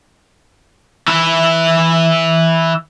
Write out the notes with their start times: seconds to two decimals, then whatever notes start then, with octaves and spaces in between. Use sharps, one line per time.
1.08 E3 E4